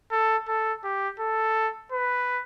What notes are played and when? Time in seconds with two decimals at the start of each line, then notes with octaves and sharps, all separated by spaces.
0.12 A4
0.48 A4
0.83 G4
1.19 A4
1.92 B4